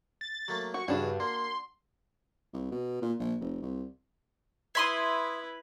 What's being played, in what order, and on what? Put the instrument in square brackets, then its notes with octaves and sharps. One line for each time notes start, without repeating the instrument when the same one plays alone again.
[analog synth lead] A6
[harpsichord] F#3 A3 A#3
[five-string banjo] F#4 [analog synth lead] C#6
[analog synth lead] G2 [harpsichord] C#3 E3 G#4 [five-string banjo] D4 F#4
[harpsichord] A#3 [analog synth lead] C6
[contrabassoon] C2
B2
A#2
A#1
F1
C2
[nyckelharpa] E4 B4 [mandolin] E5 C6 D#6 [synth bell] G#6 B6 F#7